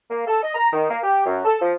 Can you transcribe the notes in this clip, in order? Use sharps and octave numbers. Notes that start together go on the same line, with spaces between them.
A#3
A4
D#5
A#5
D#3
A#3
G4
F#2
A4
F3